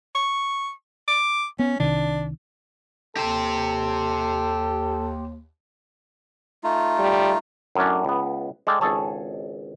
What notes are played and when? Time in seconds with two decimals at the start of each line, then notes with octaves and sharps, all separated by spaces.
0.15 C#6
1.08 D6
1.59 B3 C#4
1.80 C2 C3 D#3 D4
3.17 D#2 G4 A4 C5
6.64 A3 D#4 F4
6.99 G3
7.75 F#2 A2 C#4 D4
8.05 C#2 B3
8.67 G#3 A4 D5 F5 G5
8.81 G#1 C#2 G#4 A4 C#5 A5